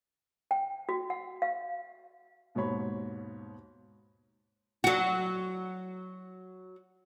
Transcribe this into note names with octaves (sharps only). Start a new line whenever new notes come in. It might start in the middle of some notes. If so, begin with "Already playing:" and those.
G5
F#4
F#5
F5
D#2 G#2 B2 C#5 B5
F#3 F#4